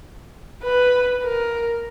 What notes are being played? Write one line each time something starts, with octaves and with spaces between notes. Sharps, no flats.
B4
A#4